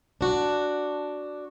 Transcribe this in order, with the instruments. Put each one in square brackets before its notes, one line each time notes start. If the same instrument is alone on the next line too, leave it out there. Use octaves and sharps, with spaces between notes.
[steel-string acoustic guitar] D4 F#4